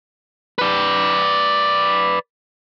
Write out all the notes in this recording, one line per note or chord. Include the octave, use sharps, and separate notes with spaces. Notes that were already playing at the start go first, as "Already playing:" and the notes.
B4 D5